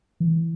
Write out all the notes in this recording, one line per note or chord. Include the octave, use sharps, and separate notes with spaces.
E3